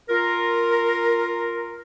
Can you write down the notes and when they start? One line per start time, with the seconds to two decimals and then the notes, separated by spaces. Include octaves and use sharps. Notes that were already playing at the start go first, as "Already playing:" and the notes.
0.09 F4 A#4